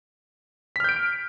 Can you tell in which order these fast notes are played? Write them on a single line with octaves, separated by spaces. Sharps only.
B6 F6 G6 D7